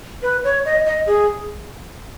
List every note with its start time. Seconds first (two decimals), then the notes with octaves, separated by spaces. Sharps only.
0.23 B4
0.44 C#5
0.65 D#5
0.86 D#5
1.07 G#4